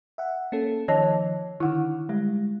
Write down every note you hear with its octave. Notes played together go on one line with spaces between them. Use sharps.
E5 F#5
A#3 C#4 A4
D#3 F3 C#5 D#5 A5
D3 D#3 E4 F#5
G3 G#3